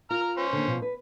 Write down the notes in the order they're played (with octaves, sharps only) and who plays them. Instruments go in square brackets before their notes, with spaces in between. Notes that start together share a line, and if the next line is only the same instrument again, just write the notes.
[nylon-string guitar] F4 [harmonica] A#5 F6
[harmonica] C#4 C5
[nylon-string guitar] D3 D#3 A#3
B2 F3
B4